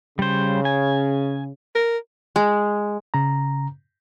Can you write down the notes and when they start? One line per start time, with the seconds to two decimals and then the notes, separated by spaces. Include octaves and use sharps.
0.19 C#3 G3 C5
0.65 G#5
1.75 A#4
2.36 G#3
3.14 C#3 A#5